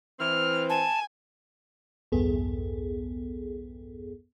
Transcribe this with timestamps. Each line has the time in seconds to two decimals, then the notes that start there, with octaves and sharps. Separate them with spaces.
0.20 E3 C4 F6
0.70 G#5 A5
2.12 B1 E2 G2 B3 G#4 A4